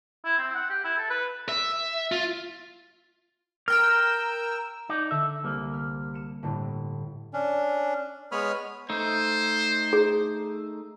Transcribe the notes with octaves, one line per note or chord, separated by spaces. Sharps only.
E4
C4
F#5
G4
E4
A4
B4
E5
F4
A#4 G5 E6 F6
D#4 D5 D6
D3 E5
C2 A#3
E6 F6
C#7 E7
G1 A2 D3
C#4 D4
G#3 B3 C#5 B5 D#6 F6
A3 D#4 C5
G#4